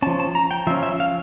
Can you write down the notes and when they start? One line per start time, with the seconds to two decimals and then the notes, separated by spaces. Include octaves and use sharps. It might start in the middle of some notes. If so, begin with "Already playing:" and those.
0.02 C#4 A5
0.07 F3
0.20 A5
0.35 A#5
0.51 G5
0.67 F3 E5
0.70 C#4
0.83 E5
1.00 F5